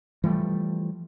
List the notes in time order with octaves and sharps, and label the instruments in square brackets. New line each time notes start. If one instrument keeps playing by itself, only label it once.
[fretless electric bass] E3 F3 G3 A3